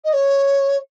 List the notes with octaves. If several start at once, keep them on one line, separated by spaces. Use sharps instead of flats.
D#5
C#5